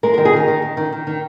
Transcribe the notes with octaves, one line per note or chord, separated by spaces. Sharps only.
G#3 A#4
D#3 A#4
G#4
D#3 A#4
D#3
D#3
D#3
D#3
D#3